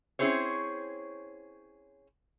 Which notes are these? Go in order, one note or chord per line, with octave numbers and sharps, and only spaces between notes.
C4 C#4 E4 G#4 C5 C#5